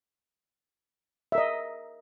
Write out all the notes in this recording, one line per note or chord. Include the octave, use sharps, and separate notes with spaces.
A#4 D#5 E5